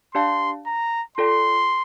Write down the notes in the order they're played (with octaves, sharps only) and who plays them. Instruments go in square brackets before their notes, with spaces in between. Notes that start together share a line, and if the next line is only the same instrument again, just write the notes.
[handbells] D4 G4 D5 F5 A5 [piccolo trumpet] C6
[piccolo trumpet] A#5
[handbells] F4 A4 D5 G5 [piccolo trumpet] C6